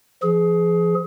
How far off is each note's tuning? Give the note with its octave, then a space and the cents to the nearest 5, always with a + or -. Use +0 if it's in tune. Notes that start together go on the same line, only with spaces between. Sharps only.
F3 -35 G#4 +20